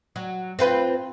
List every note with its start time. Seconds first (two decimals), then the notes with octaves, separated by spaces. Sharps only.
0.16 F#3
0.59 C4 F4 B4